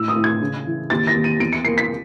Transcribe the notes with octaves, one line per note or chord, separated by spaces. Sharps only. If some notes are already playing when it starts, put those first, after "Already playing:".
Already playing: A2 E6
D#6
A2
G#6
C#3
E3
D#2 A6
A#6
D#2
D#7
E2 D7
C#7
A#3 C7
B6